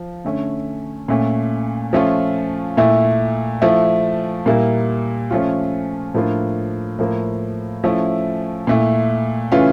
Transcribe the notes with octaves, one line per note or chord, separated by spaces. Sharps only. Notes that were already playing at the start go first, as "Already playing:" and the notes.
Already playing: F3
D3 A3 C#4
A#2 A3 C#4
F3 A3 C#4 F4
A#2 A3 E4
F3 A3 E4
A#2 G3 A#3 E4
F3 A3 C#4 F4
A2 F3 A#3 D4 F4
A2 F3 A#3
F3 A3 C#4 E4
A#2 A3 E4
C#3 E3 A3 C#4 F4